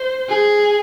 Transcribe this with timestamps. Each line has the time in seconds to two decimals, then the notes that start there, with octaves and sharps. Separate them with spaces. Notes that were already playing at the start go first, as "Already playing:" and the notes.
Already playing: C5
0.29 G#4